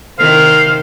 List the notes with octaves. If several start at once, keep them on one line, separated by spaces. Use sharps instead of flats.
C3 D#3 C5 F5